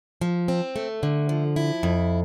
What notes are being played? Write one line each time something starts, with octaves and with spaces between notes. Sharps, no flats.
F3
C4
A3
D3
F3
E4
F2